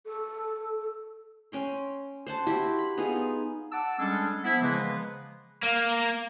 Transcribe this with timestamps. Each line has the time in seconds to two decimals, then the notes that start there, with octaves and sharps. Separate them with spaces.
0.06 A4
1.52 C#4 G5 C6
2.26 C5 F#5 A5
2.47 E4 F#4 G4 C5
2.79 B5
2.97 B3 D#4 F4 G#4
3.72 F#5 A5 D6 E6
3.99 G3 G#3 C#4 D4 G#4 A4
4.44 F3 B3 E4
4.62 C#3 E3 F3 G#3 A#3 B3
5.63 A#3